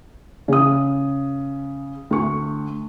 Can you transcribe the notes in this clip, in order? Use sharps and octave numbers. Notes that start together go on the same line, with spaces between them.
C#3 D#6
D2 C#6